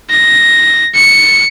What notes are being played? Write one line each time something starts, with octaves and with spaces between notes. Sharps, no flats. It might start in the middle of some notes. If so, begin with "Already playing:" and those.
A#6
C#7